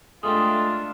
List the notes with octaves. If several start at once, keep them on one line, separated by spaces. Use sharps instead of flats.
G#3 A3 D4 F4 G4 A4 C6 D#6